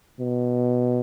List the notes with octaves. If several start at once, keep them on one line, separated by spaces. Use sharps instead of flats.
B2